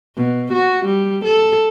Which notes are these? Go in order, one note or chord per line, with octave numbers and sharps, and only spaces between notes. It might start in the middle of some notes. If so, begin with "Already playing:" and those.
B2
F#4
G3
A4